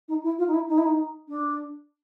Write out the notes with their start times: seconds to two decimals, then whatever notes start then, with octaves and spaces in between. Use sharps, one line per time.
0.08 D#4
0.23 E4
0.38 F4
0.47 D#4
0.54 E4
0.69 D#4
0.78 E4
0.86 D#4
1.28 D4